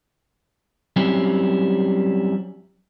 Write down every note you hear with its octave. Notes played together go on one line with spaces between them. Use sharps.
F#3 G3 C4 C#4 E4 G4